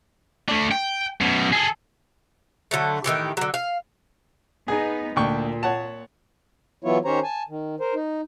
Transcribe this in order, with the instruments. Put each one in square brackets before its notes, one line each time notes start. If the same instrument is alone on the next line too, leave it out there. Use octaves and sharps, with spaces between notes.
[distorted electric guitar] A3 D4
G5
F#2 B2
G#4 A4
[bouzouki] D3 F#3 A3
A2 D#3 E3 G4
D3 F#3
F5
[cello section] B3 D#4 [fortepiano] G#4
[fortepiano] D2 G5 C#6 [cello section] A#2
[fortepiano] C#5 F#5 A5
[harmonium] E3 F#3 B3 E4 F4 C#5
D#3 C#4 G4 C5 C#5 A#5
G#5 A5
D#3
A#4 C5
D#4